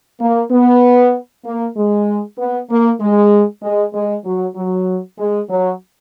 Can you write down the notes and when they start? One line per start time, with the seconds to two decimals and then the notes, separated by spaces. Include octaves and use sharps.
0.21 A#3
0.51 B3
1.45 A#3
1.77 G#3
2.38 B3
2.70 A#3
3.01 G#3
3.63 G#3
3.94 G#3
4.25 F#3
4.56 F#3
5.19 G#3
5.50 F#3